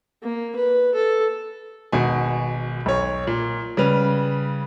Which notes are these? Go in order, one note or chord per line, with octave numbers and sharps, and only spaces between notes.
A#3
B4
A4
G#1 B2 G#5
B1 C#5
A#2
C#3 G3 B4 F7